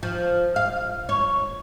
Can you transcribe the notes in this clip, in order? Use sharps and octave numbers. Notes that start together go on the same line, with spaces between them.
F3
F5
C#5